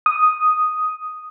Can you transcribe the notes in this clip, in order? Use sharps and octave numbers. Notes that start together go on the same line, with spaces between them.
D#6